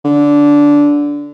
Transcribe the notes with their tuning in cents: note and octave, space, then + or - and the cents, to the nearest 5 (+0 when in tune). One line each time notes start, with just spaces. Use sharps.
D3 -15